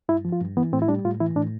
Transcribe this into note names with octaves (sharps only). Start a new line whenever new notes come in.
G2 E4
F3
F4
G2
E3 B3
A2 C4
E4
G3 D4
A2 F4
E3 E4
A2 D4